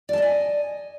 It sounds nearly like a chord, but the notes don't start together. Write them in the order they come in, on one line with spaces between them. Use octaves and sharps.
D5 A5 D#5 G#5